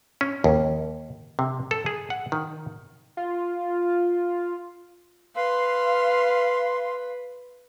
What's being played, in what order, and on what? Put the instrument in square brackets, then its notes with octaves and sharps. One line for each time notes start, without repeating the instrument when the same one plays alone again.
[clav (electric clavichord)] C#4
D#2
C3
A4
G#4
F#5
D#3
[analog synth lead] F4
[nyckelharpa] B4 [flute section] F5 C6